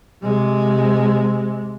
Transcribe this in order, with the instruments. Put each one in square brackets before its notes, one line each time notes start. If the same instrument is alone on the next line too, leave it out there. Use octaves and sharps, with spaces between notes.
[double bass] C3 G#3